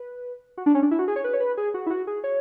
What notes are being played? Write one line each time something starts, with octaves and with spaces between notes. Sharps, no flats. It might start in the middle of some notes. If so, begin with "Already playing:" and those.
Already playing: B4
F#4
D4
C#4
D4
E4
F#4
G#4
C#5
B4
C#5
B4
G#4
F#4
E4
F#4
G#4
C#5